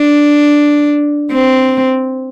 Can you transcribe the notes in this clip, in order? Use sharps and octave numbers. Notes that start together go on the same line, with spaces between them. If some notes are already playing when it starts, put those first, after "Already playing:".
Already playing: D4
C4